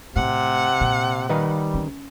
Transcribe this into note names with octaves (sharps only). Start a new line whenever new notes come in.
A2 C3 F#5
A#2
D#3 G3 D#4 B4
C#4